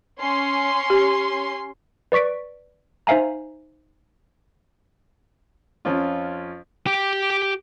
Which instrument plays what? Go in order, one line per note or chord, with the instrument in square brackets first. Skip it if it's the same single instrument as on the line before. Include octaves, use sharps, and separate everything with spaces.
[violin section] C#4 C6
[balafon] G4
[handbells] B4 D5 C#6 B6 D7
D#4 C5 E5 F5 G#5 A#5
[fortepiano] F2 C#4 F4
[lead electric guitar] G4 G5